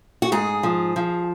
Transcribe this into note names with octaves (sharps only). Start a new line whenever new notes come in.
F#4
G#2 G#4
F3
F3